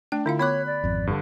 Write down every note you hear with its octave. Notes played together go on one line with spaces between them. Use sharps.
A3 D4 G5
D3 E4 F4 F5
B3 C#5 B5 C#6 D6 F#6
D5
G#1 F2
G2 D3